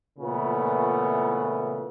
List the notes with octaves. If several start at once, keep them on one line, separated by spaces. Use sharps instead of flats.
A#2 C#3 E3 A3 B3